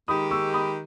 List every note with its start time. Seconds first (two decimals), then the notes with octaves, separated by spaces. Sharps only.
0.08 D#3 G#3 D#4 G4 B5 D#6
0.31 C#6 E6
0.53 B5 D#6